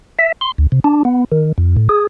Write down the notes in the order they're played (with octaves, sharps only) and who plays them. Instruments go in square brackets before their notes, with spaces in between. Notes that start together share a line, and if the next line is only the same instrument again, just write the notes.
[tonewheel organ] E5
C6
D2
C3
D4
B3
D#3
F2
A2
G#4